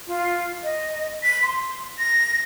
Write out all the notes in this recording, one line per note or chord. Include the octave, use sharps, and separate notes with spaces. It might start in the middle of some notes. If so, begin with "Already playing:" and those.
F4
D#5
B6
C6
A#6